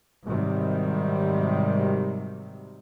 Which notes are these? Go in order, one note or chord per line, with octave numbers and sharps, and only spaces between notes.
G#2 C3 D#3 F#3 G3